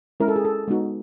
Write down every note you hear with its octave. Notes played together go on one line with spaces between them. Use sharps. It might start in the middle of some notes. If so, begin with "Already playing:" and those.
G#3 C#4 E4 A#4
A4
G#4
A4
G#3 B3 D#4 F#4